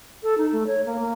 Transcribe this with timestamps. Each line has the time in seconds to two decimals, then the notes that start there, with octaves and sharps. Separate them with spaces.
0.23 A4
0.38 D#4
0.53 A3
0.67 C#5
0.86 A#3
0.99 A#3